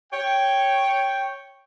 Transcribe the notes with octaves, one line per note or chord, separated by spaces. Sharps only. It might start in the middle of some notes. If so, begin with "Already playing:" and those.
C#5 G5